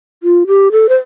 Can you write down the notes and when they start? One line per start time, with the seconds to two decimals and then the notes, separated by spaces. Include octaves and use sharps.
0.23 F4
0.47 G4
0.72 A4
0.89 C5